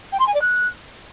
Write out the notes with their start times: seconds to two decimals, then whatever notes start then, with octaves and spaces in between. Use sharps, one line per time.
0.12 G5
0.19 C6
0.26 G#5
0.34 D5
0.41 F#6